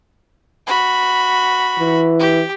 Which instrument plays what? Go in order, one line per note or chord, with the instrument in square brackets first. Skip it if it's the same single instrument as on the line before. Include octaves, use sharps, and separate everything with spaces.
[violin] F#4 B5
[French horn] E3
[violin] G4